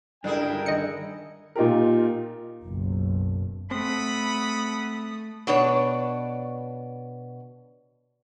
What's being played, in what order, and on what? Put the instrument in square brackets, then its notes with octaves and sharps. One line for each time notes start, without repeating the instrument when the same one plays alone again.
[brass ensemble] C#2 A#4 G5 [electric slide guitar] G2 D4 [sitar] D3 E4 G#4
[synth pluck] D#3 D#5 C#7
[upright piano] A#2 D#4 F4 G4 A#4
[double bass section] F#1 B1
[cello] A3 [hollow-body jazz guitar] C4 [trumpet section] F#5 B5 [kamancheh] D#6
[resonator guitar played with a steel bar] B2 D4 B4 C#5